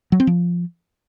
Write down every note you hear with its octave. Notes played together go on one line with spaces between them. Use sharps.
F#3
C4
F3